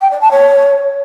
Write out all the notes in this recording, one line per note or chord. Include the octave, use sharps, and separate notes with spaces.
G5
D5
A5
C#5